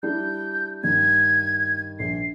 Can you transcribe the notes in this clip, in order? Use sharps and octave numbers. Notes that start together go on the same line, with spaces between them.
G3 D4 E4 G6
G2 D#3 G#6
A#1 C7